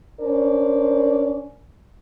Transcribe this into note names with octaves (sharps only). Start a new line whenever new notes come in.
C#4 D4 A#4 C5 D5